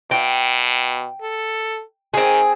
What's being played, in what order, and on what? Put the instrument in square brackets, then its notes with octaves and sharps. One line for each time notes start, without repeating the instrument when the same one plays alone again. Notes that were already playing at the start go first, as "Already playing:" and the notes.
[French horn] B2 [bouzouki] G5
[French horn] A4
[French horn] D#3 [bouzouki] C4 G#4